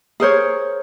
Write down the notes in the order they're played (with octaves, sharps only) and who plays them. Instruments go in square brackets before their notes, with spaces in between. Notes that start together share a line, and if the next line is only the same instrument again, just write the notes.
[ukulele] G#4 A#4 C5 C#5